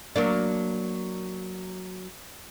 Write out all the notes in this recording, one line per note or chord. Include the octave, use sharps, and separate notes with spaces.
F#3 A#3 D4